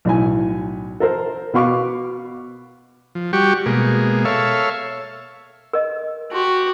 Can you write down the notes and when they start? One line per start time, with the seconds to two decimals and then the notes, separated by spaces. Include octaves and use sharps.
0.05 B1 A2 G#5
1.00 A4 A#4 C5
1.54 B2 B3 F5 C#6 D6
3.15 F3
3.33 G3 F#4 G4 C#6
3.66 B2 G#3 A#3
4.25 A4 C#5 E5 F5
5.73 A#4 D#5
6.32 F#4 G4 A5 C6